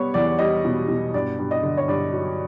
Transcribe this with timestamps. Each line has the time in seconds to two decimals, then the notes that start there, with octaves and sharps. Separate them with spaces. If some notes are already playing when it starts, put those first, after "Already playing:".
Already playing: G3 B3 C#5
0.14 E2 D5
0.39 G3 D#5
0.65 B2
0.88 B2
1.14 G2 D5
1.39 G2
1.51 D#5
1.63 D3
1.77 C#5
1.88 G2 D5
2.13 F#3